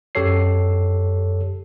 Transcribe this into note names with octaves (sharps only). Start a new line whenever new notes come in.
F#2 G4 A4 C#5 C7